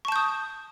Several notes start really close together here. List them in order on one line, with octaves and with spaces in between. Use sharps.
C#6 A5 G6 D#6